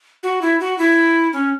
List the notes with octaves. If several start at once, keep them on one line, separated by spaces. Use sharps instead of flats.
F#4
E4
F#4
E4
C#4